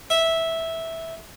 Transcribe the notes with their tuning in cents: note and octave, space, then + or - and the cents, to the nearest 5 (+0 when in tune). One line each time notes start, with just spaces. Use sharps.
E5 -10